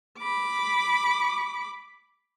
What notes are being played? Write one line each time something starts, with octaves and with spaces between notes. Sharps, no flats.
B5 D6